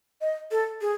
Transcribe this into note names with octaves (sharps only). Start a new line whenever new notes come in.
D#5
A4
G#4